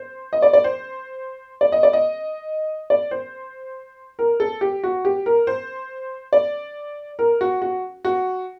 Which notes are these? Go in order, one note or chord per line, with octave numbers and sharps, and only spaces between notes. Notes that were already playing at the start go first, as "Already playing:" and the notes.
Already playing: C5
D#5
D5
D5
C5
D5
D#5
D5
D#5
D5
C5
A#4
A4
G4
F#4
G4
A#4
C5
D5
A#4
F#4
F#4
F#4